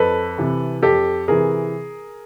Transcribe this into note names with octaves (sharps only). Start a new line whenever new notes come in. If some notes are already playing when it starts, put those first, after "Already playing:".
Already playing: F2 A4 B4
C3 E3
F2 G4 A4
C3 E3 G#4 A#4